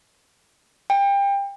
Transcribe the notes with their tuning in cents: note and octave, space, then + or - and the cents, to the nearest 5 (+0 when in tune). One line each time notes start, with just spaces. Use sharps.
G5 +30